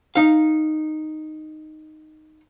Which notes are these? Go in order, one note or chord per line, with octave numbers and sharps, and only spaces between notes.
D#4 F5